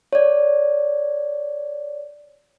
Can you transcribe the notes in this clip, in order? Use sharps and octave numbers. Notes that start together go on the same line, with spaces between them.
C#5 D5